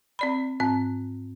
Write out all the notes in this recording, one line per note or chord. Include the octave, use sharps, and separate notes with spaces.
C4 D5 B5
G#2 C4 F#6